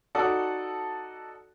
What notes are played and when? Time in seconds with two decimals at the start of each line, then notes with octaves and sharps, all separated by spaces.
0.15 D#4 F#4 A4 D5 F#5 D#6